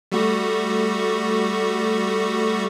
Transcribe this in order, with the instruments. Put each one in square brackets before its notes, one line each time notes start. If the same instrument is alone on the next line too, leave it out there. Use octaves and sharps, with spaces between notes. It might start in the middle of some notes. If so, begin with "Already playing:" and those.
[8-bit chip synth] G3 A3 F#4